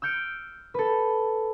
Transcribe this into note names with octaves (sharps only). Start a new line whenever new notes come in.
E6 F6 G6 C#7 D7
A4 B4